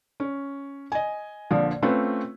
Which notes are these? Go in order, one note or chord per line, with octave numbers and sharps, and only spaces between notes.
C#4
D#5 G#5
A#1 A#2 D3 F3
A3 C4 C#4 F4 B4